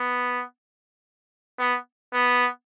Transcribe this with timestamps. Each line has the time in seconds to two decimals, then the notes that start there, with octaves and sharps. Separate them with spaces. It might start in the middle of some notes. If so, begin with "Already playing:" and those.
Already playing: B3
1.58 B3
2.13 B3